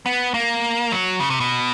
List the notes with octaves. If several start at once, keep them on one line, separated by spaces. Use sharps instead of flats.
B3
A#3
F#3
C#3
C3
B2